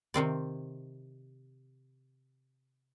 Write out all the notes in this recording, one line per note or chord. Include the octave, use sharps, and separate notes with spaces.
C3 D#3 C4 D5